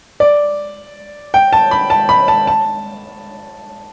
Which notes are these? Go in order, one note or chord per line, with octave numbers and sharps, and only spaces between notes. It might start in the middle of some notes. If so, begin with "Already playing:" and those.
D5
G5
A5
B5
A5
B5
A5
A5